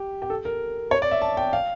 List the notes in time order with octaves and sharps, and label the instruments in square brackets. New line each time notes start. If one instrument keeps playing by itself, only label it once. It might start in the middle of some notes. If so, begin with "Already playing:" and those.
Already playing: [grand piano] G4
G4
A4
A#4
C#5
D5
E5
A5
G5
F5